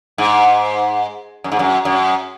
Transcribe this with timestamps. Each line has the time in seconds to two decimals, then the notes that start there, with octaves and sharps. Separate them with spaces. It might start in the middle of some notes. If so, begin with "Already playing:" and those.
0.18 G#2
1.44 F#2
1.52 G#2
1.59 F#2
1.85 F#2